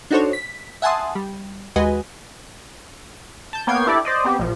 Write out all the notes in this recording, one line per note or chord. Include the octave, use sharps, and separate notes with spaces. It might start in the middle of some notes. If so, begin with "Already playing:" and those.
D4 D#4 F#4 A4 C5 C#5
B6
E5 F#5 G#5 A5 C6 D#6
G3
D#2 G#3 F#4 B4 D#5 G#5
A5 G6
A#3 B3 C#5 G5 G#6 C7
D4 E4 G4 A4 D5
C5 D5 D#5
B3 C4 G4
A#1 F3